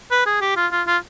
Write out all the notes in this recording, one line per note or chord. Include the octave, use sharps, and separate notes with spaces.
B4
G#4
G4
F4
F4
F4